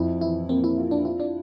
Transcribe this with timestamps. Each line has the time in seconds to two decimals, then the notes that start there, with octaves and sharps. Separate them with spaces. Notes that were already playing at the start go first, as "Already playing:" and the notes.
Already playing: F2 E4
0.21 E3 E4
0.49 A#3 C4
0.64 E4
0.78 F4
0.91 D4
1.05 E4 F4
1.20 D4